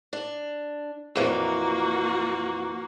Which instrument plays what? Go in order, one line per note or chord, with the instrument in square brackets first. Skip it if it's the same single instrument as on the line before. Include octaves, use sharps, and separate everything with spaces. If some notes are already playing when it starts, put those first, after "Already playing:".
[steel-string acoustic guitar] D4
[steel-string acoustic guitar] F2 A#2 E3 [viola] A#3 F#4